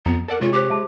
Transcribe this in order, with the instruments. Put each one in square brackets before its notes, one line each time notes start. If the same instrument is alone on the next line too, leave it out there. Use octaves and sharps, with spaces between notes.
[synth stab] F2 [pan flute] B3 [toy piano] A#5
[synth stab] A4 D5 F#5 [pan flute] A#4
[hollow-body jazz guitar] C3 C#5 [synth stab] G#3 [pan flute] F4 [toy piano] C6
[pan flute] G4 [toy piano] C5 D6
[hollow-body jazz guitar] G#3 [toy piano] E5 A5 D6